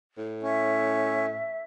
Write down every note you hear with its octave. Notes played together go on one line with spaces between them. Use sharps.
A2
C#4 E5